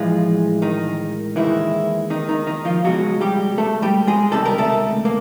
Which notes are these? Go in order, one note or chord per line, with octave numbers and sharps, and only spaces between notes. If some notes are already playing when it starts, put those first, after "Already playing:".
Already playing: A2 E3 F3 G#3 F4
D#3 D#4
D#2 D#3 E3 G#3 E4
D#3 D#4
D#3 D#4
D#3 D#4
F3 F4
C#2 B2 F#3 G#3 F#4
G3 G4
A3 A4
G3 G4
G#3 G#4
C#2 C3 D#3 G3 A4
A#4
A3 A4
A#3